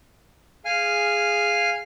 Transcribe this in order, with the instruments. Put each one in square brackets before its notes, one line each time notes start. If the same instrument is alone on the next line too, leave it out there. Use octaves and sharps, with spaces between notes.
[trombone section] G#4 [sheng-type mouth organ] F5 G#5 F6